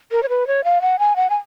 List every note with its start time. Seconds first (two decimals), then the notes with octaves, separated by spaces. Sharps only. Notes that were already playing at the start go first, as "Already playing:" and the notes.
0.12 A#4
0.23 C#5
0.29 B4
0.47 C#5
0.64 F5
0.82 F#5
0.99 G#5
1.16 F#5
1.30 G#5